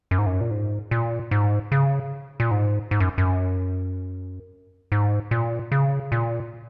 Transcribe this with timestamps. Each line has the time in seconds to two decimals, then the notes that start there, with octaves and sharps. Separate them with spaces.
0.11 F#2
0.19 G#2
0.26 F#2
0.41 A#2
0.51 G#2
0.91 A#2
1.31 G#2
1.72 C#3
2.40 A#2
2.51 G#2
2.91 G#2
3.00 F#2
3.18 F#2
4.92 G#2
5.31 A#2
5.72 C#3
6.12 A#2